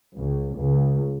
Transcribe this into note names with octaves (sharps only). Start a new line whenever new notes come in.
C#2
C#2